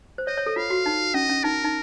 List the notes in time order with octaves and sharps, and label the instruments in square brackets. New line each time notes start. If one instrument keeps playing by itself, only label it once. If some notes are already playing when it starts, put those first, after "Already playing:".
[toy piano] C5
[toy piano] C#5 [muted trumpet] D#5
[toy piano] C#5
A4
[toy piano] F4 [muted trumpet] F5
[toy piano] F#4
D#4
[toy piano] C#4 [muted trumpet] D#5
[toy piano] C#4
[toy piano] D#4 [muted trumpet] A#4
[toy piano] D#4